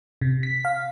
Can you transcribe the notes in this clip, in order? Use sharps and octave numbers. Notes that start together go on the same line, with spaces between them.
C3
B6
F5